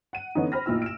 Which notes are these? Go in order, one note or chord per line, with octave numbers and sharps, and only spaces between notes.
F#5 D#7
D3 E3 B3 C#4 D#4
C5 B5 F6 A#6
A1 A#2 D#4 E4 E6
D7 E7